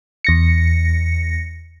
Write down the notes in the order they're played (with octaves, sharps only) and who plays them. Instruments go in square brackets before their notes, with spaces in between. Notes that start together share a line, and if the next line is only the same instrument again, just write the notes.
[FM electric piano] E2 A#6 C#7